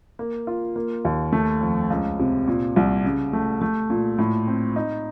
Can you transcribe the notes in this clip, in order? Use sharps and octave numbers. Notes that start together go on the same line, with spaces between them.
A#3
F4
A#3
D#2
A3
F2
C#2
C3
A#2
C2
C#3
A3
A3
A#2
A2
C4
D#4